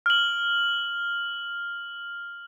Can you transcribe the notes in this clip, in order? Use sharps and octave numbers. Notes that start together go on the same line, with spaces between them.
F6 F#7